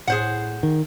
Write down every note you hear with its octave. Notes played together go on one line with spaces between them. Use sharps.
A2 G#4 C5 F#5
D#3